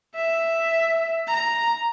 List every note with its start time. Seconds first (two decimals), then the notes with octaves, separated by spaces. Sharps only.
0.16 E5
1.28 A#5